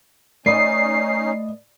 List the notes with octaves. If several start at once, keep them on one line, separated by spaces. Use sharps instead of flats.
A3 C#4 D#4 B4 D5 D#5 C7